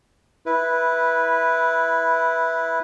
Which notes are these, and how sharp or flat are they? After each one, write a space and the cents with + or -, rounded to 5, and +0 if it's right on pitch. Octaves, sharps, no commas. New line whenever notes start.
E4 +0 B4 -10